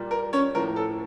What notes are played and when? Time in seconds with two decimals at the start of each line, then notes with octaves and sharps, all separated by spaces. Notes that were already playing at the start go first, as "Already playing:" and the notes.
Already playing: A#2 G3 A#3
0.11 A#4
0.33 C#4 C#5
0.54 A2 F3 A#3 A#4
0.76 A4